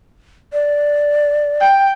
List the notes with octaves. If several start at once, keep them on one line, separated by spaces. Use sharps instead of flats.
D5
G5